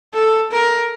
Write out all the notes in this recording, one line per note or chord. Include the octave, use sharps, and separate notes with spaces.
A4
A#4